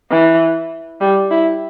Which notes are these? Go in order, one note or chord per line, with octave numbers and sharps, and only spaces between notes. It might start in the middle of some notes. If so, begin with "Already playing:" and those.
E3
G3
E4